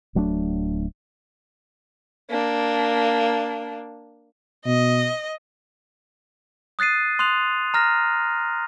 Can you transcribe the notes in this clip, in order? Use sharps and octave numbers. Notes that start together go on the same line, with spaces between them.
D1 F#3 A3 D4
A#3 D4
B2 D#5
D#6 F#6 A6 C7 D#7
C6 D#6 F#6 F7
A#5 F6 A#6